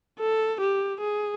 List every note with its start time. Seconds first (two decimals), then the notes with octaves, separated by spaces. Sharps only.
0.19 A4
0.61 G4
1.00 G#4